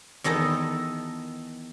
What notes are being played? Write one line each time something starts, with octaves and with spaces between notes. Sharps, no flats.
E2 D#3 D#4 A4 D#5